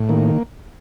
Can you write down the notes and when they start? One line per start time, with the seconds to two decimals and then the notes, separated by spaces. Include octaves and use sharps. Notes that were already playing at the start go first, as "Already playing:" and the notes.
Already playing: A2
0.09 D#3 A#3